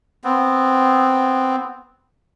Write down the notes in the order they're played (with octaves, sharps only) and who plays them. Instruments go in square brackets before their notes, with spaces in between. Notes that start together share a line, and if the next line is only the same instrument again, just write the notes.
[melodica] B3 C4